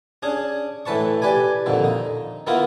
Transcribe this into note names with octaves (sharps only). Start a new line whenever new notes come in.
C#4 D4 G#4
A2 E3 B4 A5 C#6
G4 B4 D5 G#5
F2 A#2 D3 D#3
D#4
D#3 A#3 B3 E4 F4 A#4